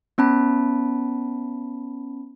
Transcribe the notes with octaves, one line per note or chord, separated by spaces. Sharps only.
B3 C#4 A5 B5